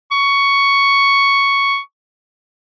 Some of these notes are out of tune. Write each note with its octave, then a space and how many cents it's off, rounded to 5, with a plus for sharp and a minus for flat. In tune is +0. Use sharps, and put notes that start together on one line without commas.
C#6 +5